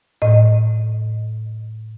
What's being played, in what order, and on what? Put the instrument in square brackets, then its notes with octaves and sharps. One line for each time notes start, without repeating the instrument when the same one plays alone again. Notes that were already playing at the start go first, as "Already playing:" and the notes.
[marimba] A2 D#5